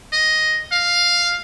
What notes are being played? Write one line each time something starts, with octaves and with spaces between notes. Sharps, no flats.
D#5
F5